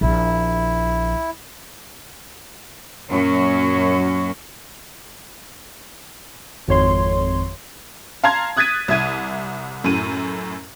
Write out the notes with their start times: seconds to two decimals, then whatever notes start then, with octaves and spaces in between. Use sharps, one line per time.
0.01 A#1 E4
3.09 F#2 A#2 F#3 C#4 F#4
6.68 G#1 F2 C#5 C6
8.24 F5 A5 A#5 C6 G#6
8.57 D#6 F#6 G#6 A6 B6 D#7
8.88 C2 E5 G#6 D#7
9.84 F#2 A2 D#7